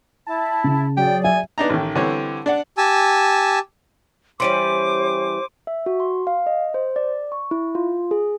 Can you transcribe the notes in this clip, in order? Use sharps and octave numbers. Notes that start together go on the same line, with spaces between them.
E4 A5
C#3
F#3 G#4 D5 G5
E5 G#5
B3 D4 D#4 A#5
A1 D#3
D3 E3 G3 C4 C#5
D4 D5 F#5
G4 G#5 A5 E6
E3 G3 C#4 C5 C6 D6 D7 D#7
E5
F#4
C6
F5
D#5
C5
D5
C#6
E4
F4
G#4